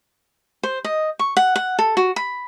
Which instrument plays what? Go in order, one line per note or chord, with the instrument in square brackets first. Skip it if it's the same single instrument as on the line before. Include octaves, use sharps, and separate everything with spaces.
[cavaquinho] C5
D#5
C#6
F#5
F#5
A4
F#4
B5